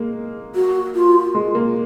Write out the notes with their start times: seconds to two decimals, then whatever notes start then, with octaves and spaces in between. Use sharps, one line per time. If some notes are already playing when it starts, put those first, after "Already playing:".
Already playing: G#3 A#3
0.55 F#4
0.95 F4
1.35 G#3
1.55 A#3